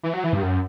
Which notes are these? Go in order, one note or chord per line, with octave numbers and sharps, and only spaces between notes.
E3
F#3
E3
G2
F#2